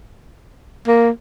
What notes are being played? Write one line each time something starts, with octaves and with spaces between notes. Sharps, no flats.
A#3